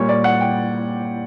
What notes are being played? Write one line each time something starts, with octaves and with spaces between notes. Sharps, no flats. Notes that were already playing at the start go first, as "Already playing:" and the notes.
Already playing: A#2 G3 C#5
D5
F#5
G5